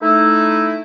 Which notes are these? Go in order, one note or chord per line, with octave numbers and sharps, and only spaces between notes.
A3 D#4 E4